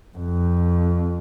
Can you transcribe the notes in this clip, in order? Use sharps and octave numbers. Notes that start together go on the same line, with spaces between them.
F2